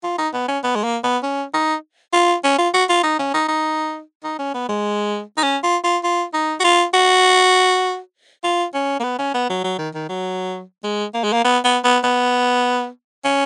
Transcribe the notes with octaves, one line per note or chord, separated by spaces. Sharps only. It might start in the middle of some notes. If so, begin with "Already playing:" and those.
F4
D#4
B3
C#4
B3
G#3
A#3
B3
C#4
D#4
F4
C#4
F4
F#4
F4
D#4
C#4
D#4
D#4
D#4
C#4
B3
G#3
D#4
C#4
F4
F4
F4
D#4
F#4
F4
F#4
F4
C#4
A#3
B3
C#4
B3
F#3
F#3
D#3
D#3
F#3
G#3
A#3
G#3
A#3
B3
B3
B3
B3
C#4